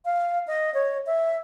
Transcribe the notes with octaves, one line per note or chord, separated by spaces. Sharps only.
F5
D#5
C#5
E5